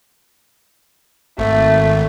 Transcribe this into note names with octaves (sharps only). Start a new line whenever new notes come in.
G#1 A3